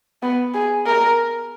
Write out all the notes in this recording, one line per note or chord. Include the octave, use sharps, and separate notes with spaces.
B3
G#4
A#4